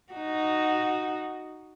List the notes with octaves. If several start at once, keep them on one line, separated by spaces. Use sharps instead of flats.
D#4 F#4